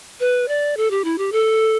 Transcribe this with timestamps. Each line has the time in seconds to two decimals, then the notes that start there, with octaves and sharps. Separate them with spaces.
0.20 B4
0.48 D5
0.77 A4
0.91 G4
1.04 E4
1.18 G4
1.32 A4